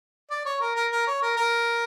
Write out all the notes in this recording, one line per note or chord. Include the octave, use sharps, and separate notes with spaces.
D5
C#5
A#4
A#4
A#4
C#5
A#4
A#4